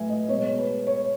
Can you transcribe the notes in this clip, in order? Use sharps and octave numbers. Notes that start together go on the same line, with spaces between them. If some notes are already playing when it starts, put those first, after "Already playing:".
Already playing: A2 F#3 A3 B4 E5 G#5
D#5
B2 G#3 B3 C#5
B4
C#5